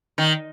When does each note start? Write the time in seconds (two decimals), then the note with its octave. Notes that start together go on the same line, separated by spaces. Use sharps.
0.18 D#3